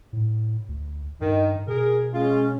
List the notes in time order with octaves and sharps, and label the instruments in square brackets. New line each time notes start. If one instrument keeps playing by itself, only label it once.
[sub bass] A2
D2
[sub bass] G2 [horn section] D#3
[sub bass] B2 [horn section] G#4 A#4
[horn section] G#3 F4 [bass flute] C#4